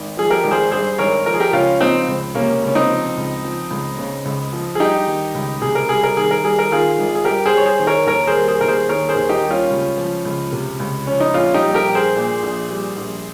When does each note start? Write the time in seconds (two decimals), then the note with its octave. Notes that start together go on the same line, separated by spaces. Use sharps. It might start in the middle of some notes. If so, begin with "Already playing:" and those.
Already playing: G#1
0.17 F3 G#4
0.30 G4 A#4
0.44 G#1
0.51 G#4 C5
0.71 G2 G#4 C5
0.98 G#1 A#4 C#5
1.26 F3 A#4
1.34 G#4
1.40 G4 A#4
1.53 C#2 C#4 F4
1.81 F3 C4 D#4
2.08 C#2
2.35 C3 A#3 C#4
2.62 C#2
2.68 C#4
2.75 C4 D#4
2.89 F3
3.17 C#2
3.44 F3
3.71 C#2
3.98 C#3
4.25 C#2
4.53 F3
4.75 G#4
4.80 G3 D#4 G4
5.07 D#3
5.34 C#2
5.61 C3 G#4
5.75 A#4
5.89 G3 G#4
6.03 A#4
6.17 D#3 G#4
6.31 A#4
6.43 G3 G#4
6.59 A#4
6.71 D#3 F4 G#4
6.99 G#1
7.15 G#4
7.25 G2 G4 A#4
7.46 G#4 C5
7.53 G3 C#5
7.66 G#4 C5
7.80 D#3
7.87 A#4 C#5
8.07 D#2 A#4 C#5
8.27 G#4 C5
8.35 G3
8.48 G#4 C5
8.61 D#2 A#4
8.68 G#4 C5
8.89 D#3 A#4 C#5
9.09 G#4 C5
9.16 D#2
9.29 D#4 G4
9.44 G3
9.50 C#4 F4
9.70 C#2
9.97 F3
10.25 C#2
10.52 C3
10.80 C#2
11.06 F3 C#4
11.20 D#4
11.34 A#1 C#4 F4
11.54 D#4 G4
11.61 G3
11.74 G4 A#4
11.88 A#1
11.95 G#4 C5
12.16 A#2
12.43 A#1
12.69 G3
12.97 A#1